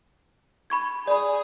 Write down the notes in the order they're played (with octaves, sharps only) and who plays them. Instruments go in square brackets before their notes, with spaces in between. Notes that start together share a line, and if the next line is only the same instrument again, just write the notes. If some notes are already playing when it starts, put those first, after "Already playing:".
[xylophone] B5 C#6 G#6
[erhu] G#4 [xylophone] D5 B5